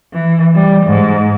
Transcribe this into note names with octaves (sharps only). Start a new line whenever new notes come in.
E3
G3
G#2